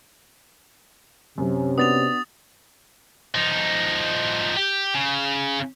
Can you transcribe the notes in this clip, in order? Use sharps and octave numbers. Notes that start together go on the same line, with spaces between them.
F#2 C3 C#4
B3 D4 F#4 D#6 A6 F7
F3 D#4
G4
C#3